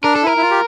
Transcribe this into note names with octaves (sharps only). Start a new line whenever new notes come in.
D4 A#4
A4
E4 A#4
E4
F4
G4